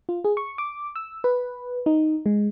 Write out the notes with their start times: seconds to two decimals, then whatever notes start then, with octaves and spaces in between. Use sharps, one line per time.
0.09 F4
0.24 G#4
0.37 C#6
0.58 D6
0.96 E6
1.24 B4
1.86 D#4
2.26 G#3